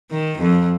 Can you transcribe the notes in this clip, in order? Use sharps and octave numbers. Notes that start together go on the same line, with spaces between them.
D#3
F2